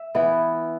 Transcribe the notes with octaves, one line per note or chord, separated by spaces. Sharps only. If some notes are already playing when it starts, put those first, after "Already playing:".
Already playing: E5
E3 B3 E4